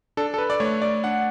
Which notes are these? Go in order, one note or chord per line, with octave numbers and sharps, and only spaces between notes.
D4 A4
A4
B4
D5
A3 C#5
D5
D4 F#5